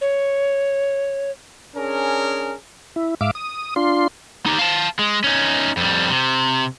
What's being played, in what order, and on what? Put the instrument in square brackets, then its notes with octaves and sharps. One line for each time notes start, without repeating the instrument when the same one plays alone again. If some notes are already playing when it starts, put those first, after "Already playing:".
[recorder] C#5
[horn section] C#4 D4 G#4 A#4
[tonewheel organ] E4
G#2 E5 F5 D6
D#6
D4 F4 C6
[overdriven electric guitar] D#4 G4
F5 A5
G#3
C#4 D#4
F2 G3
C3